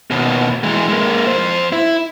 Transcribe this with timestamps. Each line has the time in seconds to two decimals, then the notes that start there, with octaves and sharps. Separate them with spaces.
0.10 D#2 B2
0.64 E3 G#3
0.89 G#3 A#3
1.27 F2 C5
1.72 E4